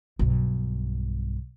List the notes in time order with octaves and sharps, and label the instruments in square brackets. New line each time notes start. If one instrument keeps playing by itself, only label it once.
[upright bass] B1 G2